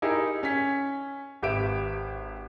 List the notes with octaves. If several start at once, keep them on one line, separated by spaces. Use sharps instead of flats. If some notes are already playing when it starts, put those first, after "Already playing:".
D#4 E4 G4 G#4 A#4
C#4 B6
G#1 G4 B4 E5 D7